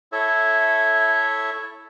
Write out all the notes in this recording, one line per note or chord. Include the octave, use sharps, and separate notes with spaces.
E4 A4 C#5 E5